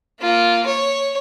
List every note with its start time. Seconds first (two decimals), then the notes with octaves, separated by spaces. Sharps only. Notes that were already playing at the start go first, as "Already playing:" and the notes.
0.21 A#3 F4
0.66 C#5